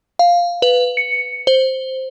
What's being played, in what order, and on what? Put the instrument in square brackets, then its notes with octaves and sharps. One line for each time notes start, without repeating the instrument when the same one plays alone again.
[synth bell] F5
B4
C#7
C5